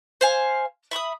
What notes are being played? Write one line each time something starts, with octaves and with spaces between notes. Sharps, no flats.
C5 F5 G#5
E5 B5 D6 D#6